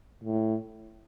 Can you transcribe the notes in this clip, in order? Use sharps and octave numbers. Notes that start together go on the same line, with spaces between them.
A2